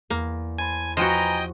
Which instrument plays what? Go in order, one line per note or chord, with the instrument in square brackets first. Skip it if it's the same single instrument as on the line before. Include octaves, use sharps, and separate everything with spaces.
[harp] E2 [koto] A#3
[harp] C5 A5 B5 [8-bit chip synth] G#5
[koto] F3 F#4 [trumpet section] B4 G#5 A#5 [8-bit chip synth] D#5 G5